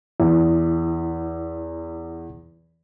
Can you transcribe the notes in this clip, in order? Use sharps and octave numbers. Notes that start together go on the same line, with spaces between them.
E2 E4